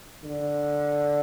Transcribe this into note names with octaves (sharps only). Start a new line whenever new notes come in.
D3